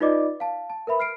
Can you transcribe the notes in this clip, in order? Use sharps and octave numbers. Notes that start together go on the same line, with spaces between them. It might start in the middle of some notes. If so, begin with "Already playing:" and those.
D#4 F4 B4 D5 D#5 D6
F5 A5
A5
A#4 B4 E5 B5
F6 C7 D7